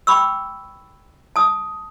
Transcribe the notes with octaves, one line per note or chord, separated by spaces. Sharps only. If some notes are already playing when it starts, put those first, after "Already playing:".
G5 B5 C#6 E6
A5 D#6